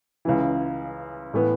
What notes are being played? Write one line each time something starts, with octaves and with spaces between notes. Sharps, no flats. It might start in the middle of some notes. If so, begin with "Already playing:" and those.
C#2 C#3 E3
A2 E3 B3